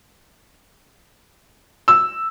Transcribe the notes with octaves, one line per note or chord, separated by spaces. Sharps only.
E6